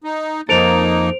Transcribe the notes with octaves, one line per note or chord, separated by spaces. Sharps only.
D#4
F2 A#3 D#4 A4 C5 D7 F7